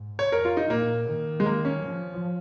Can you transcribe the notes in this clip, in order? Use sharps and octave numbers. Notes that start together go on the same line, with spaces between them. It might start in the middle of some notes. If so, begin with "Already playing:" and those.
Already playing: G#2
C#5
F2 A#4
F4
D#4
A#2 A#3
D#3
G#3
A#3
C#4
F3